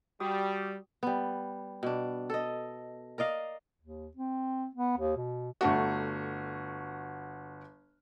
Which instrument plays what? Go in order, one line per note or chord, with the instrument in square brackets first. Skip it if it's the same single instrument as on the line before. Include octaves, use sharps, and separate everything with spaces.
[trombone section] G3 [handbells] F#4 G5 D#6
[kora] G3 B3
B2 D4
A4 D#5
A#4 D5 D#5 F5
[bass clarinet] D#2
C4
B3
D#2
B2
[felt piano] G1 A3 F#4